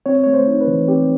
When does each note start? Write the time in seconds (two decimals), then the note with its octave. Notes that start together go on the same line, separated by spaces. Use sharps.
0.06 C4 C#5
0.24 A3 C#5
0.34 C5
0.48 D#4
0.61 B4
0.67 E3
0.88 C4 G4